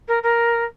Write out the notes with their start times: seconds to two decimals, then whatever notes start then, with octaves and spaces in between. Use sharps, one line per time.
0.08 A#4
0.23 A#4